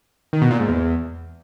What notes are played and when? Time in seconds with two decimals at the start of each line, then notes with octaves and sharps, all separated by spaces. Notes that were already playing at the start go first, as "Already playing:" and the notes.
0.33 D#3
0.42 B2
0.51 A#2
0.59 G#2
0.68 E2